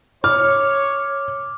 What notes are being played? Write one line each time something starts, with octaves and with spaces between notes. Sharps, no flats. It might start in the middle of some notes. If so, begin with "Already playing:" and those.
C#5 D6 F6